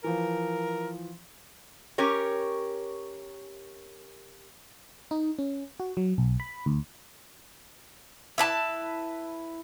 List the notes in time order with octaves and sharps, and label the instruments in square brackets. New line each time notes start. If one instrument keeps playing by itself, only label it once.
[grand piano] E3 F3 [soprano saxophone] A#4
[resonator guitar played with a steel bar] C#4 G4 A#4 C#5
[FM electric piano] D#4
C#4
F#4
F#3
B1
B5
D2
[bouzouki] E4 B4 A5